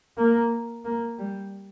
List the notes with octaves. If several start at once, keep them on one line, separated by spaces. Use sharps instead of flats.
A#3
A#3
G3